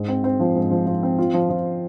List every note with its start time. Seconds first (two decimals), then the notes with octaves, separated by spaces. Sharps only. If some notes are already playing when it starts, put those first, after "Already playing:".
Already playing: G#2
0.08 C4
0.24 C4
0.40 F3
0.56 G#2
0.71 F3
0.86 F3
1.03 C4
1.18 F4
1.34 F3
1.49 F3